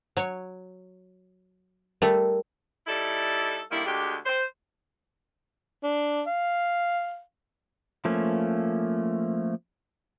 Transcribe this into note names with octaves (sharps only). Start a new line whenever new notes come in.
F#3 C#5
G3 A3 A#4
G3 D#4 E4 A4
D3 D#3 G3 A#3 E4
D2 G#3 G4
C5
D4
F5
F3 A3 A#3 C#4